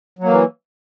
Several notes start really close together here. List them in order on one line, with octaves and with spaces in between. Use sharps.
F#3 A#3 E3